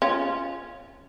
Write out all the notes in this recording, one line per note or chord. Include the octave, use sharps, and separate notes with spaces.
C#4 F4